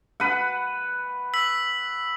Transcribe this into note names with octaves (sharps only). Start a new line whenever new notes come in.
B4 F#5
E6 B6 F#7